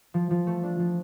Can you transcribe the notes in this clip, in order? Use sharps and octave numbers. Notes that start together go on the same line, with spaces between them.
F3
F3
A3
D4
F3